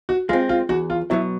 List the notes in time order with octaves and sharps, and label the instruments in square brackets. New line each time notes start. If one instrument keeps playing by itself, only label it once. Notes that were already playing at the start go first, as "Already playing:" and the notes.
[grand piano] F#4
[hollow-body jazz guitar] G#3 C4 [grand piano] F4
[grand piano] F4
[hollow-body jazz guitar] E2 [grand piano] F#4
[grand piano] F4
[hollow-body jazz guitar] B2 F#3 B3 [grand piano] E4